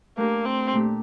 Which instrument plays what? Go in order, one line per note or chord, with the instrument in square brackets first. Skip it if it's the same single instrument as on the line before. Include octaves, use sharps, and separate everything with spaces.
[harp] A3 D4 G4 A#4 [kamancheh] A#3
[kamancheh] C4
[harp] A#2 A3 D4 G4